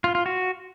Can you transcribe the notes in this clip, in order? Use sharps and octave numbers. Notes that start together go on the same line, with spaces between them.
F4
F4
F#4